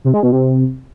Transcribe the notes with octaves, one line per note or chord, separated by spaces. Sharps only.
C3
G#3
B2
C3